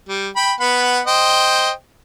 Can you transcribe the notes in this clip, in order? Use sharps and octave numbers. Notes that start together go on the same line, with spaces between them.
G3
G5 B5
B3 F#5 B5
C5 D#5 G5